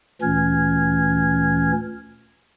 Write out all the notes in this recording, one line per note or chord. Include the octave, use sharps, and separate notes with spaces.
D2 A#2 E3 C#4 F6 G#6